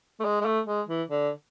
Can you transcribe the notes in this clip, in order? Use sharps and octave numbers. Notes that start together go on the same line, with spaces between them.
A3
G#3
G#3
A3
G#3
E3
D3